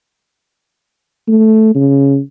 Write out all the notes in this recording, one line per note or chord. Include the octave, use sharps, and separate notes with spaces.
A3
C#3